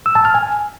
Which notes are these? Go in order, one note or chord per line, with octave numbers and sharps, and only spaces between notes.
E6
A5
F6
G#5